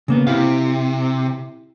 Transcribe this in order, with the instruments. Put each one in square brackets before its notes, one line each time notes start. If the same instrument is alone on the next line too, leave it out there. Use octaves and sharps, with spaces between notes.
[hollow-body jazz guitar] C#3 A#3 B3
[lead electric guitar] C3 [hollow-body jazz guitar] E4 G4 F5